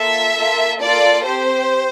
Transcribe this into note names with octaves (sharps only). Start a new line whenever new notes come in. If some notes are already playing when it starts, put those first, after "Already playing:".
Already playing: A#3 F4 A4 E5
A#3 F4 A4
A#3 F4 A4 D5
C4 G4 C5